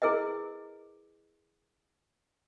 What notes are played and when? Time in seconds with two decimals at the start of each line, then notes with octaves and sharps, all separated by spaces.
0.02 E4 G#4 A#4 B4 D#5